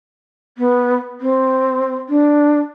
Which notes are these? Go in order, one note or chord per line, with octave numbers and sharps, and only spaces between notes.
B3
C4
D4